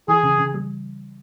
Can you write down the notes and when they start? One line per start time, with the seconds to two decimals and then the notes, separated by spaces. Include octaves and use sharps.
0.08 E3 G#4
0.23 C#3
0.38 C#3
0.54 G3